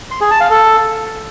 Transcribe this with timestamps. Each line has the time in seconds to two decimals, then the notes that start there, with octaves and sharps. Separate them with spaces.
0.11 C6
0.21 G#4
0.31 A5
0.41 F5
0.50 A4